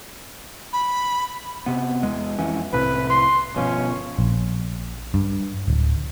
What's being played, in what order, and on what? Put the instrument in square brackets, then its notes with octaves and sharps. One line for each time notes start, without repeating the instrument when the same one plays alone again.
[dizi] B5
[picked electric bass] C3 B3
E2 G#3
F2 E3 C#4
[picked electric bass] C2 A2 C3 [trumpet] B4
[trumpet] C6
[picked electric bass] G1 B2 F3 [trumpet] C#4
[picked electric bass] A#1
G2
D1